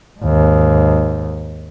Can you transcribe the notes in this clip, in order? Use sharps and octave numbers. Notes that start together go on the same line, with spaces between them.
D#2 G#2